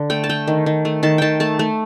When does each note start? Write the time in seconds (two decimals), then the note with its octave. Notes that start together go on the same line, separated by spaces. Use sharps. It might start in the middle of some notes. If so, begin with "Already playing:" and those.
Already playing: D3
0.10 A3 G5
0.24 A5
0.29 A3 G5
0.48 D#3
0.66 D#3
0.85 A3
1.03 D#3 A5
1.18 D#3 G5 A5
1.40 A3 A5
1.59 A3